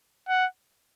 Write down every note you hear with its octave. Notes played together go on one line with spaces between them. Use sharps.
F#5